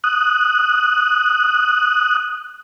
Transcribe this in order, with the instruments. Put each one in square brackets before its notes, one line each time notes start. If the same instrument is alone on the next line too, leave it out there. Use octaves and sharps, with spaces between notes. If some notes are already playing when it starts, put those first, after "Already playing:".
[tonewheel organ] D#6 F#6